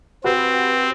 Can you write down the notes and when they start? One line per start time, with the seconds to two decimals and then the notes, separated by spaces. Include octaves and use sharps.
0.24 C4 F#4 G4 B4